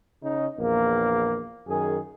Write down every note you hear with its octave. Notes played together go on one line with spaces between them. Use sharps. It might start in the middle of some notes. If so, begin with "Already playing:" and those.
C#3 D#4
A#1 E2 A#3
F#2 D#3 G#4